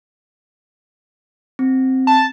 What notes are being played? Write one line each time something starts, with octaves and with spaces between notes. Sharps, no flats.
C4
A5